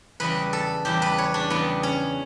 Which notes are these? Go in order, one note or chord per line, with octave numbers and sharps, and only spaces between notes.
E2 C#3 G3 B4
A4
E2 C#3 G3 G4
B4
C#5
D4
E2 C#3 G3 B3
C#4